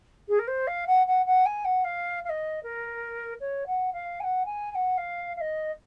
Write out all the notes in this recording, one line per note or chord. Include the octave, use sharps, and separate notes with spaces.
G#4
A#4
C5
F5
F#5
F#5
F#5
G#5
F#5
F5
F5
D#5
A#4
C#5
F#5
F5
G#5
F#5
G#5
G#5
F#5
F5
F5
D#5